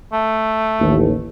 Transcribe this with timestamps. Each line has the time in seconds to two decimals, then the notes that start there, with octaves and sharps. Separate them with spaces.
0.13 A3
0.79 A1 D#2